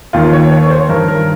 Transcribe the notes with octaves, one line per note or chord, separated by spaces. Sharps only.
D#2 D#3 F4
C#5
C#5
C#5
C5
G2 D#3 A#4
A#4